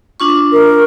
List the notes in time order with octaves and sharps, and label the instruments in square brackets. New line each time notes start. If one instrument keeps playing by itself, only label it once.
[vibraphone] D4 F4 C#6
[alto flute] A#4